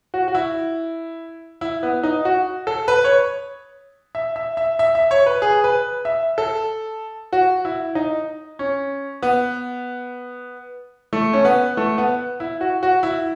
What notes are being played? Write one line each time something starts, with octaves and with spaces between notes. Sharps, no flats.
F#4
F#4
E4
E4
B3
D#4
F#4
A4
B4
C#5
E5
E5
E5
E5
E5
C#5
B4
G#4
B4
E5
A4
F#4
E4
D#4
C#4
B3
A3
C#4
B3
A3
B3
E4
F#4
F#4
E4